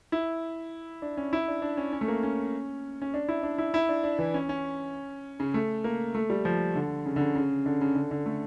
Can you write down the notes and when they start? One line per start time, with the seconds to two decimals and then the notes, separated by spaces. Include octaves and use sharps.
0.12 E4
1.02 D4
1.17 C#4
1.33 E4
1.48 D4
1.62 D4
1.77 C#4
1.93 C#4
2.01 A3
2.08 A#3
2.23 C#4
3.02 C#4
3.14 D4
3.29 E4
3.43 D4
3.58 E4
3.74 E4
3.89 D4
4.04 D4
4.19 E3
4.34 C#4
4.49 C#4
5.40 C#3
5.54 A3
5.84 A#3
6.15 A3
6.30 G3
6.45 F3
6.75 D3
7.06 C#3
7.16 D3
7.20 C#3
7.35 C#3
7.66 D3
7.81 C#3
7.95 D3
8.11 D3
8.26 A3